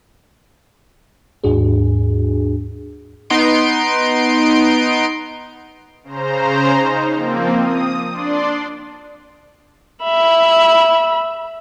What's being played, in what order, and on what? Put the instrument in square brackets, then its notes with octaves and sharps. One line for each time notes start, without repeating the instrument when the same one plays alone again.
[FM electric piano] D#2 G#2 D4 F#4 G#4
[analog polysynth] B3 D#4 C6 C7 D7
[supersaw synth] C#3 C5 A#5
D#4
F3 A#3 C4
D#6
D4 D5 C6
[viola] E5 B5